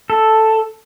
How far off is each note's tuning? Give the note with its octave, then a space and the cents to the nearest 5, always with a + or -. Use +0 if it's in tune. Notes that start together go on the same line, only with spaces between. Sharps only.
A4 +0